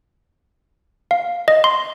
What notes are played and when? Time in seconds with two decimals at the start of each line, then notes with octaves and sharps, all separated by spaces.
1.11 F5
1.48 D#5
1.64 C6